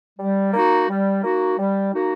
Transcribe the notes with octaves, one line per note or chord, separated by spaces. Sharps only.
G3
A#3 D#4 F#4
G3
A#3 D#4 F#4
G3
A#3 D#4 F#4